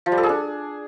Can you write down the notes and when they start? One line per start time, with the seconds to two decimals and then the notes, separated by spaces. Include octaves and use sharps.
0.06 F3
0.12 G3
0.18 A4
0.23 G#4
0.29 D4